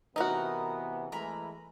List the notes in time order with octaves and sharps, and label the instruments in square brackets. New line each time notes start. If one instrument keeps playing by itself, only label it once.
[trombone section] C3 E3 B3 [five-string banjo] D#4 F#4 [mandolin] A#4 D#5
[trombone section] E3 G#3 A3 [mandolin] A#4 A#5 B5